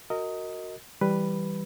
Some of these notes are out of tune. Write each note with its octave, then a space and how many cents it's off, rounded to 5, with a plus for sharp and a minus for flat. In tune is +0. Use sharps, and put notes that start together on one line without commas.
F#4 +0 A#4 -20 D#5 +10
E3 +0 G3 +0 B4 +0